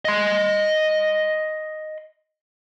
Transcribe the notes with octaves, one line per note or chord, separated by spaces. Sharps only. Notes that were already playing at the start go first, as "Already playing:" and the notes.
D#5 C6